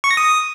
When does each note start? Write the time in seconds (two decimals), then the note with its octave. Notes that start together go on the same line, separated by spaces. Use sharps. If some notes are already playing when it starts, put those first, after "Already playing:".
0.04 C#6
0.11 A#6
0.17 D#6